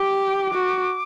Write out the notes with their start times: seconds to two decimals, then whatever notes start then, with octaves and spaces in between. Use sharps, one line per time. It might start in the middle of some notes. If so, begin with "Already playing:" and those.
Already playing: G4 D6
0.54 F#4